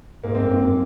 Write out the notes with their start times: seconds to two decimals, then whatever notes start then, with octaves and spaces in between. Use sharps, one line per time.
0.24 G#2 A#3
0.35 C4
0.41 F#2 A#3
0.53 G#2
0.59 F#2